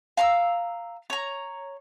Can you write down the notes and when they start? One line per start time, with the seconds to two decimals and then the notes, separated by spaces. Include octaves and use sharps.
0.17 F5 A#5 C6 E6
1.10 C#5 A#5